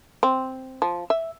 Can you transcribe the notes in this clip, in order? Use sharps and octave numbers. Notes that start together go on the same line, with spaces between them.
C4
F3
E5